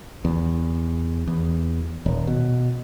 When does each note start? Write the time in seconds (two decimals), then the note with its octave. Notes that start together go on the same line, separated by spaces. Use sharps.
0.25 E2
1.27 E2
2.06 D#1
2.27 B2